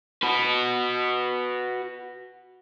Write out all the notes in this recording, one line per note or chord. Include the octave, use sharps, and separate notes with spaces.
F#4 B4